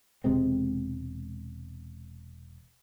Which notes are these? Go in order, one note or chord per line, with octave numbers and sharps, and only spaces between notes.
E1 C3 G#3 C4